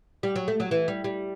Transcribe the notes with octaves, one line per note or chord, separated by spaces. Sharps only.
G3
F#3
A3
F#3
E3
G3
G3